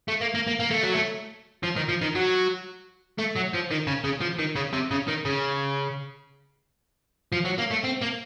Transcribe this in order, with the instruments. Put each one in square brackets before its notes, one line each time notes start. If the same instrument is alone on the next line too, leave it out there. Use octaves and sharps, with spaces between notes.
[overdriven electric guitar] A3
A#3
A#3
A#3
A#3
A3
F#3
A3
F3
D#3
F3
D#3
F#3
A3
F#3
F3
D#3
C#3
C#3
F3
D#3
C#3
C3
C#3
D#3
C#3
F3
F#3
A#3
A3
C4
A#3